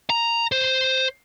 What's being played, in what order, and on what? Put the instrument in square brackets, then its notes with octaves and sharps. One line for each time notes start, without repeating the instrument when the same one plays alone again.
[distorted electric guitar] A#5
C5